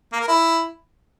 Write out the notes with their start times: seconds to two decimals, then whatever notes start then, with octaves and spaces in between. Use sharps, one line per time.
0.13 A#3
0.20 A#4
0.28 E4